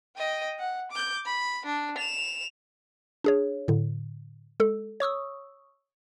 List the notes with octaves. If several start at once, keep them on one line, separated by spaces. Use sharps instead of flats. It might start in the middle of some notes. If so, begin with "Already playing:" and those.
D#5 G5
F#5
D6 G6
B5
D4
E7 F7
D4 G#4 C#5
A2 D3
G#3 A4
C#5 C#6 D#6 E6